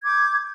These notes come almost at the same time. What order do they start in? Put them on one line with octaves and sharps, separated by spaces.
G#6 D6 G6